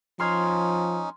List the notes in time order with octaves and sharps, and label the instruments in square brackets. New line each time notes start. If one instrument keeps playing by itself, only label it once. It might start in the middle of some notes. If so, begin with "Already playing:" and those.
[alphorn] F3 [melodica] C#4 D#4 [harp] C6 F6 G#6